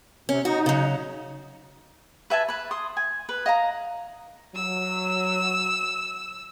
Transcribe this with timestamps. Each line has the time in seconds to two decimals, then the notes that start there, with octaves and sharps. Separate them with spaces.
0.29 C3 C#4
0.45 D#4 F#4
0.66 C#3 F#3
2.30 B4 E5 G#5 A5
2.49 B4 B5
2.71 C6 D#6
2.97 G#5
3.29 B4
3.46 D#5 F5 A#5
4.55 F#3 E6